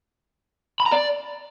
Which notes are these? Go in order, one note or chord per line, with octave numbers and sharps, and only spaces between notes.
B5
A#5
D5